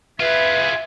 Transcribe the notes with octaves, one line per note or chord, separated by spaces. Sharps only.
F4 G#4 B4 E5 G#6